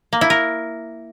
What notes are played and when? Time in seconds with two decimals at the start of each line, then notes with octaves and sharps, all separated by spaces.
0.13 A#3
0.21 E4
0.30 A#4